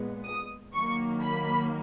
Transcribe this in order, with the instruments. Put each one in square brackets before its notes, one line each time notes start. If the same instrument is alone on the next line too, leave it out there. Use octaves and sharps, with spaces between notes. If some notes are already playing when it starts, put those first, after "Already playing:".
Already playing: [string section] A#2 G#3 B3
D#6
D#3 F#3 A#3 C#6
B5